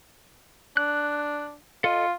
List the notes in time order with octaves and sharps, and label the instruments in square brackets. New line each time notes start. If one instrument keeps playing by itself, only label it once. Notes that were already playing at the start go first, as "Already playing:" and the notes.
[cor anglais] D4 [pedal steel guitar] F#6
[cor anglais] F4 [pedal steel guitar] A4 D#5